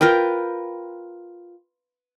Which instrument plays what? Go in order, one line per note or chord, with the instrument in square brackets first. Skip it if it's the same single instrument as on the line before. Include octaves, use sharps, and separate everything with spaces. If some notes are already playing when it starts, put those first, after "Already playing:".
[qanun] F4 A#4 B4 G5